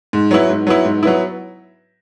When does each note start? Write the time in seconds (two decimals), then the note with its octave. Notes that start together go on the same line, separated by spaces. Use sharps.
0.13 G#2
0.31 F#3 B3 E4
0.49 G#2
0.67 F#3 B3 E4
0.85 G#2
1.03 F#3 B3 E4